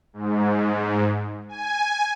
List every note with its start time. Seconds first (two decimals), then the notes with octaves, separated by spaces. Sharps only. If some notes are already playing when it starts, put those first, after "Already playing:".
0.13 G#2
1.49 G#5